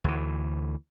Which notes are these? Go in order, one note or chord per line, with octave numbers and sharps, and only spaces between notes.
D2 E3